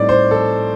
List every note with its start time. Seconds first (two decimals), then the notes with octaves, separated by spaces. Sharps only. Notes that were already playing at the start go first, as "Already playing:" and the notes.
Already playing: A2 G3 C4 D#4 D5
0.09 C5
0.31 A4